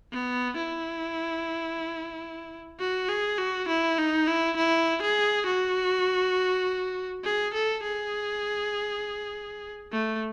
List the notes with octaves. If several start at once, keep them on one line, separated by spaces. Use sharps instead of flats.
B3
E4
F#4
G#4
F#4
E4
D#4
E4
E4
G#4
F#4
G#4
A4
G#4
A3